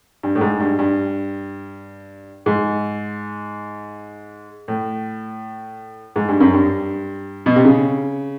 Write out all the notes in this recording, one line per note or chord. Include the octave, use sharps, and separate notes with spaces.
G2
A2
G#2
G2
G2
G#2
A2
G#2
G2
F#2
G2
B2
C3
C#3